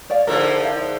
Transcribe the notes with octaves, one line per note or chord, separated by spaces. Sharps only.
C#5 D5 F5
G#2 D3 F3 A4 A#4 C#5
E4 E5 F5